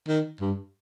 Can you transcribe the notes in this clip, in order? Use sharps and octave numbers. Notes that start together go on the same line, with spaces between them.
D#3
G2